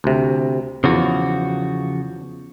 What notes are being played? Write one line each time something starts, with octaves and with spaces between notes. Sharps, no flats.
D2 C3
E2 C#3 F3 F#4